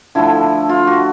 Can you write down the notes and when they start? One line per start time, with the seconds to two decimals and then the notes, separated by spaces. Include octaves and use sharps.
0.15 D3 F3 A3 E4
0.69 F4
0.87 F#4